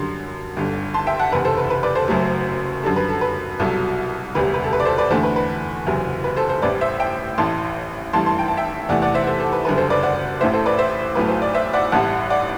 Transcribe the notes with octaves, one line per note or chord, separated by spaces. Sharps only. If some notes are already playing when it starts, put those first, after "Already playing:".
Already playing: F#2 D3 G3 C6
G1 G2 D3
A5 C6
E5 G5
F#5 A5
F#1 E2 C3 B4
A4 C5
B4
B4
B4 D5
A4 C5
F#1 F#2 F#3 A3
F#2 D3 G3 A4
B4
A4
B4
C2 B2 F#3 A4
E1 D2 C3 G3 B4
B4
A4
B4
D5
A4 C5
B4 D5
E2 D3 A3 A4 C5
B4
B4
F#1 E2 C3 F#3
B4
A4 C5
A4 C5
A1 A2 E3 G3 B4 D5
C5 E5
E5 G5
A1 A2 E3 A5 C6
A1 G2 E3 A3 A5 C6
A5 C6
G5
A5
E5 G5
E2 C3 E3 A3 D5 F#5
D5 F#5
C5 E5
A4 C5
A4 C5
B4
F#1 F#2 D3 G3 B4
A4 C5
B4 D5
D5 F#5
A1 A2 E3 A3 C5 E5
A4 C5
B4 D5
C5 E5
B1 A2 F#3 A3 B4
C5
D5
C5 E5
D5 F#5
A1 A2 G3 F#5 A5
D5 F#5